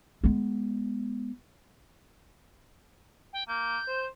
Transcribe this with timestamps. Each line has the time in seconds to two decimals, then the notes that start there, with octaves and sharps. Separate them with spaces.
0.24 G#3 B3
3.33 G5
3.48 A#3 G6
3.88 C5